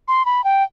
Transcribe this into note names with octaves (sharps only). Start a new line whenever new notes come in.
C6
B5
G5